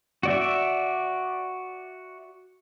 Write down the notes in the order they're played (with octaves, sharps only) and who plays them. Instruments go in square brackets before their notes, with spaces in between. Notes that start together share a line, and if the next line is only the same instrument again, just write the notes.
[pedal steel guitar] F#4 D5 E5